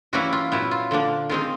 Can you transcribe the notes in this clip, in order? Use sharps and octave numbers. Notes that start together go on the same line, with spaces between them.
E3 G3 A#3 C#4 E4 F#4
F4
A#2 F#3 B3 E4
F4
D3 F3 A#3 D4
D#3 G#3 C4 D#4 F4